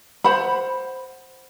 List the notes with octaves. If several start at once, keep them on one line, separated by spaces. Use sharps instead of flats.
C5 F#5 B5